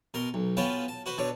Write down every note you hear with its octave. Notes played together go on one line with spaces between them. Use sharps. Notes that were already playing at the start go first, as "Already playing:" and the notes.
B2 A#4 C6
B1
B3 C#4 F4 B4 G5 A5
A5
F#4 B4 C5
B2 D3 D4 C#5